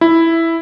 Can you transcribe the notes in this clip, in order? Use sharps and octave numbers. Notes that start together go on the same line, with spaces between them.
E4